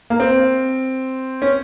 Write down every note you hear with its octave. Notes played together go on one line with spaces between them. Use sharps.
A#3
C4
C#4